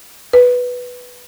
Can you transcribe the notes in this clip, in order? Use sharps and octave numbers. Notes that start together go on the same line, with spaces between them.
B4